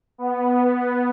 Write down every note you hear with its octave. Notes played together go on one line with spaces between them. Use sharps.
B3
B3